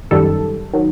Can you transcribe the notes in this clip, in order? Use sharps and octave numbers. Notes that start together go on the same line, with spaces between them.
F#2 D#3 G3 A4
D#3 F#3